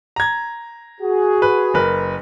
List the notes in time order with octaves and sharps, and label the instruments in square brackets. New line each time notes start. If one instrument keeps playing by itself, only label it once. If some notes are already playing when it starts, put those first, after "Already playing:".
[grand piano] A#5 G#6
[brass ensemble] F#4 G#4
[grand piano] B4
F#1 A#4 B4